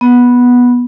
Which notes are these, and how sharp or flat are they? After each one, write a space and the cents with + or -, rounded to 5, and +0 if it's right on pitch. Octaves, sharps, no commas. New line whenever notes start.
B3 -10